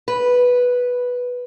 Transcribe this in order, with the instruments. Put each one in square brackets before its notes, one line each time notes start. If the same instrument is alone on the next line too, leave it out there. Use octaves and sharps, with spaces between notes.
[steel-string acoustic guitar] B4